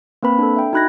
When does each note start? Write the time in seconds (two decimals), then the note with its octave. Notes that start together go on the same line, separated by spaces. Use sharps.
0.23 A#3 C4 B4 B5
0.39 D4 A4
0.56 E5 G5
0.73 D#4 F#4 B5 F#6 G#6 A#6